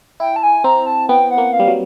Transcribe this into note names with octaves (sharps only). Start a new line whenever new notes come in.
E4 G5
A5
G#5
C4 A#5
A5
B3 G5
F#5
A#3
F5
G3
F#3